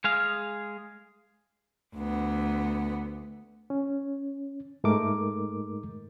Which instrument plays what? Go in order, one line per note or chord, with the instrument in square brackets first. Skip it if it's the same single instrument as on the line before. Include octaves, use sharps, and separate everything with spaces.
[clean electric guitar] G#3 G#4 F5
[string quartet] D2 B3
[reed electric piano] C#4
G#2 G#3 A3 D#4 A#4 D6